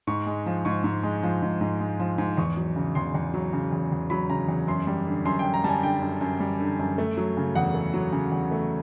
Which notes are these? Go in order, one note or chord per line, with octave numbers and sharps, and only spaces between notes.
G#2 C#6
G#3
F3
G#2 C#6
G#2
G#3
F3
G#2
G#2
G#3
F3
G#2
E2 C#6
F#3
C#3
E2 C6
E2
F#3
C#3
E2
E2
F#3 B5
C#3 A#5
E2
F#2 C6
G3
D3
F#2 C6
G5
F#2
A#5
G3 G#5 A5
D3 G5
F#2
F#2
G3
D3
F#2
A3
F#3
C#3
E2 F#5
A3
F#3
C#3
E2
A3